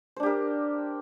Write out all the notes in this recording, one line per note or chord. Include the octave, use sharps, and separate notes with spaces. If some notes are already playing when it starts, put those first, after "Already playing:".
D4 G4 A#4 C5